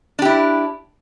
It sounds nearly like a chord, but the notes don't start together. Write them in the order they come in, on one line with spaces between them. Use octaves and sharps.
D4 G4 E4